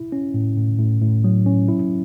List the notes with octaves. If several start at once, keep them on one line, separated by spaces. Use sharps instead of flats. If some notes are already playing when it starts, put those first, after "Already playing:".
Already playing: E4
C#4
A2
A2
A2
A2
F#3
C#4
E4